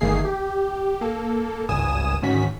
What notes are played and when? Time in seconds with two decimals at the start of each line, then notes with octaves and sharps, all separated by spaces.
0.01 G1 D#3 A3 A#3 G#4 C7
0.25 G4
1.01 A#3 A4
1.69 G#1 C#2 G2 G#5 D#6 E7
2.22 D2 G#2 D#3 C#4 F#4 B6